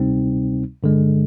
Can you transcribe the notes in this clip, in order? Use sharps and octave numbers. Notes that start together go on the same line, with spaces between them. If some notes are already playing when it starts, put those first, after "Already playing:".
Already playing: D2 C3 G3 C4 D#4
G2 D3 G#3